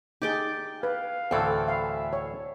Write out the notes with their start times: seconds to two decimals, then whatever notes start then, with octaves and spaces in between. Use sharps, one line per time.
0.22 D#4 G4 G#4 D5 G5
0.83 B4 F5
1.31 D2 A2 E3 C4 A4
1.68 E5 F5
2.13 C#5